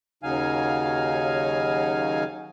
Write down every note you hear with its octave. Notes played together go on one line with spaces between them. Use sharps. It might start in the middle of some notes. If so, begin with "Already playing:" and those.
D#2 C#3 F#3 D#4 F5 G#5